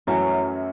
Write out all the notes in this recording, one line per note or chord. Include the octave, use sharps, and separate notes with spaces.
F#2 E3 F#3 A3 C#4